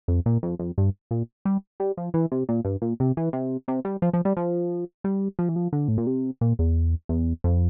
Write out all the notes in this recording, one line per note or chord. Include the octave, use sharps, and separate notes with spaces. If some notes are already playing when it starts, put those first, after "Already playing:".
F2
A#2
F2
F2
G2
A#2
G3
G3
F3
E3
C3
A#2
G2
A#2
C3
E3
C3
C3
G3
F3
F3
G3
F3
G3
F3
E3
F3
D3
A2
A#2
C3
A#2
E2
E2
F2